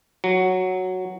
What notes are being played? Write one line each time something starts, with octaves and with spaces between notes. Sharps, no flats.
F#3